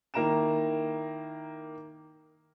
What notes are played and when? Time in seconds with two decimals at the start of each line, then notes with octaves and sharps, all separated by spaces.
0.14 D#3 A#3 E4 A#5 D7 E7